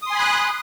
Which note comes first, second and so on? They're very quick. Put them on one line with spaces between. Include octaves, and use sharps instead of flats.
D#6 C6 G#5 B5 F#6